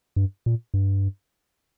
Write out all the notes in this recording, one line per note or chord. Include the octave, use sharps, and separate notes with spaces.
G2
A#2
G2